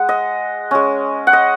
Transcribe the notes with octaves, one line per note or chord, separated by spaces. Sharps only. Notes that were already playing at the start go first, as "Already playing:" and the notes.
Already playing: G#3 F#5
D#5
G#3 C#4
F#5
D#5